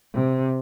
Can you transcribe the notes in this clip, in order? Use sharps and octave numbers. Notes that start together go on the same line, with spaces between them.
C3